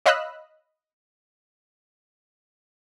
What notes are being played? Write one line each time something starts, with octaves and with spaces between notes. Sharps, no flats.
C#5 D#5 F5 B5 E6 F#6